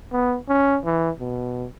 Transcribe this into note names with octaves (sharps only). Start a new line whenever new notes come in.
B3
C#4
E3
B2